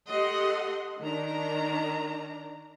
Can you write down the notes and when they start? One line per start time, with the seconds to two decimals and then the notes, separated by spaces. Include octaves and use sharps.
0.11 G4 A4 D#5 F#5 C6
1.02 D#3 D4 A#5